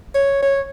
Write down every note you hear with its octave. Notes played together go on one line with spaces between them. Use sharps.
C#5
C#5